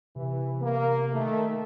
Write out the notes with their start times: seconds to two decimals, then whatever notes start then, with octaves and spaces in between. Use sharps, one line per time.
0.16 C3 E3
0.61 A#3
1.12 D#3 A3